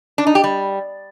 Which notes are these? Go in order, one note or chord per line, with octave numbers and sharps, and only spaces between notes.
D4
D#4
G4
G3